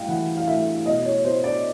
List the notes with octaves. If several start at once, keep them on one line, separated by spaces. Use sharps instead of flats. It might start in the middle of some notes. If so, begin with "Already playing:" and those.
Already playing: A2 G3 F5 G5
E3 F#5
F5
A2 E5
B2 D#5
C#5
B3 C5
D5